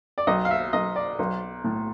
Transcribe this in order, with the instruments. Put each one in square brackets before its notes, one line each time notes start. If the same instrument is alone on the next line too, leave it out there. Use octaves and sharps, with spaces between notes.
[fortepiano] D5
B1 D#5
F5
E5
B1 D#5
D5
B1
A2